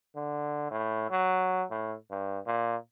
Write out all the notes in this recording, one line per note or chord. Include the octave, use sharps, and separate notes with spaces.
D3
A2
F#3
A2
G2
A#2